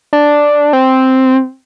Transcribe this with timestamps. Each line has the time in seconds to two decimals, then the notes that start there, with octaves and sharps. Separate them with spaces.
0.13 D4
0.73 C4